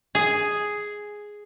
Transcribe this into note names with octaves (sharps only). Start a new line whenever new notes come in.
G#4